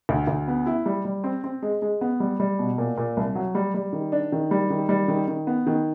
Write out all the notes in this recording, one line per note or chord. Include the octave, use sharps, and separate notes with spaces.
D2
D2
B3
E4
G3
G3
C4
C4
G#3
G#3
B3
G3
G3
B2
A#2
A#2
C2
F#3
G3
G3
D#3
D4
D#3
G3
D#3
G3
D#3
D#3
B3
D#3